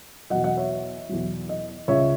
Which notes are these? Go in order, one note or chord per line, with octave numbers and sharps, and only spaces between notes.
E2 B2 F#3 D#5 F#5
D#5 F#5
C#5 E5
E2 B2 F#3
D#5
C#2 C#3 G#3 C#5 E5